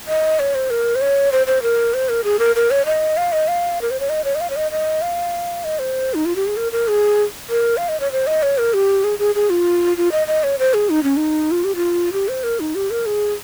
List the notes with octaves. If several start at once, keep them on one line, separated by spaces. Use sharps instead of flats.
D#5
C#5
C5
A#4
C5
C#5
C5
C5
A#4
C5
A#4
G#4
A#4
A#4
C#5
D#5
F5
D#5
F5
A#4
C5
C#5
D#5
C#5
D#5
F5
C#5
D#5
D#5
F5
D#5
C5
D#4
F4
G4
G#4
A#4
A#4
G#4
A#4
F5
D#5
C#5
C5
D#5
C#5
A#4
G4
G#4
G#4
G#4
F4
F4
D#5
D#5
C#5
C5
G#4
D#4
C#4
D#4
F4
G4
F4
G4
C5
A#4
D#4
G4
A#4
G#4